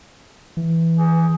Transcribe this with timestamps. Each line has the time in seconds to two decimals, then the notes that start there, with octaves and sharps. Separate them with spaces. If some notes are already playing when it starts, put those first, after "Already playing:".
0.57 E3
0.99 G#4